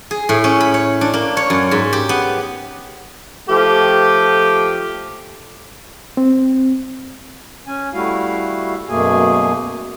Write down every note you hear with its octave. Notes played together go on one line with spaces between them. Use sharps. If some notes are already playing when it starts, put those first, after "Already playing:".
G#4
A2
C#4
B5
C#5
D4
A#3
C#5
F#2
G#2
G4
B3
F3 A3 G4
C4
C#4 G#5
G3 A3 E4 F#4 F5
F#2 B2 A3 A#3 G#4 G#5